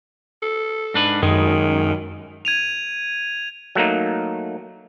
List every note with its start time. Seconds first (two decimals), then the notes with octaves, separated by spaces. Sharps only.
0.43 A4
0.94 G#2 D4 B4
1.22 F#2 D#3 G#3
2.45 G#6 D#7 F7
3.75 F#3 A3 A#3 D#4